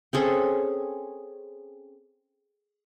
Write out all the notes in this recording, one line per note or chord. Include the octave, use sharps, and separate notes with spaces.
C4 C#4 G#4 A4